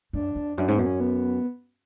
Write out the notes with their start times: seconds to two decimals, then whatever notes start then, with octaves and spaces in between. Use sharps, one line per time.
0.13 F#2 D4
0.35 F2
0.57 F#2 D4
0.66 G#2 C#4
0.76 F#2 B3
0.86 C#4
1.00 B3